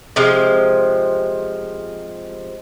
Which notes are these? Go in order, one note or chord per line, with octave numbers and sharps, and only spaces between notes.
C3 F3 G#3